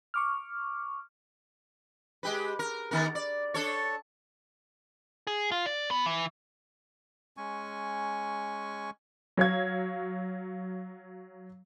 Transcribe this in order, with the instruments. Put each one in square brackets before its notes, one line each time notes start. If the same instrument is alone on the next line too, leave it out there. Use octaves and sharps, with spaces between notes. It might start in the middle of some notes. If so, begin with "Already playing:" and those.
[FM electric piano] C#6 D6 F6
[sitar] G#3 G4 B4
A#4
D#3 B3 A#4
D5
D4 A4 C#5
[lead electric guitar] G#4
F4
D5
B3
E3
[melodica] G#3 C#4 G#5 C#6
[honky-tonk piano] F#3 C#5 F5 G#6